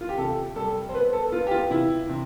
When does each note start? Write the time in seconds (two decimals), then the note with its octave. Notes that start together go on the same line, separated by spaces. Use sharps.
0.01 F4
0.09 G4
0.18 C3 A4
0.56 G3 A4
0.89 C5
0.94 B3 B4
1.13 A4
1.32 B3 F4
1.47 G4
1.51 F4
1.70 C3 E4
2.09 C3